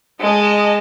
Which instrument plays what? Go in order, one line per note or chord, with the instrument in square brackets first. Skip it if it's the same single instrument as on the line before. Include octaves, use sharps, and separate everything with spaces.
[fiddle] G#3 [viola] D#5 A5